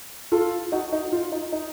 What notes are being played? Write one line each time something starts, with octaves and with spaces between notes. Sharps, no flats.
F4 A4
D#4 F#4
D#4
F4
D#4
D#4